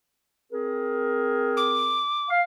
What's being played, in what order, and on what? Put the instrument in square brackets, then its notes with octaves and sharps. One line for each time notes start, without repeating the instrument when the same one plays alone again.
[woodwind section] C4 G#4 A#4
[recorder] D6
[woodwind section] F5